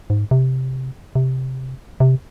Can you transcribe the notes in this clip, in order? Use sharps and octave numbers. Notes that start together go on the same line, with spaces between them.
G#2
C3
C3
C3